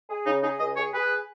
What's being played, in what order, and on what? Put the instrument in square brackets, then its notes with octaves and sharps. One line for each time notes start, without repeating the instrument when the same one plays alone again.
[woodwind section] G#4
[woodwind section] C#3 [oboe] D#4
[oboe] D#4 [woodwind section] G#4
[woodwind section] C#2 [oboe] D#5
[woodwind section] G#4 [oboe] C#5
[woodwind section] G#4 [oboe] B4